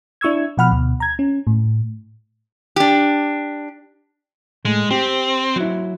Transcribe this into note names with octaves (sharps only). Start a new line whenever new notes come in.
D4 E4 C#6 E6 G#6
B2 F3 F#5 B5 F6
D2 B2
A#5 G#6
C#4
A2
D4 G4
A2 G#3
C4 G4
F#3 E4